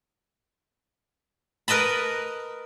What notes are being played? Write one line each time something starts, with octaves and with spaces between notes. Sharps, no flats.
A#4 B4 D#5 A5 B5